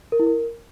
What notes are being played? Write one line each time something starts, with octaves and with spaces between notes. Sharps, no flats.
A#4
E4
A#4